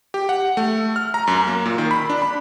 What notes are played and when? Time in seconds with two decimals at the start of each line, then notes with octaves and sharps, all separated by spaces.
0.14 G4
0.29 F#5
0.57 A3
0.96 F6
1.14 A#5
1.27 F#2
1.48 A#3
1.66 A#2
1.78 D#3
1.91 B5
2.10 D4
2.22 B5